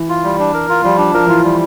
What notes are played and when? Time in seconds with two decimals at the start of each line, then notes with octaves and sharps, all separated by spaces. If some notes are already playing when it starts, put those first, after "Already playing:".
Already playing: E3
0.09 F4
0.24 G3
0.39 D4
0.54 A#4
0.69 F4
0.84 F3 G3
0.98 D4
1.14 F3 A#4
1.27 E3 F4
1.44 G3